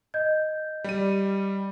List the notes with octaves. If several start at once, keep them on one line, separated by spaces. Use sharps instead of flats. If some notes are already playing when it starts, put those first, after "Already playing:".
D#5 G6 G#6
G3 D#7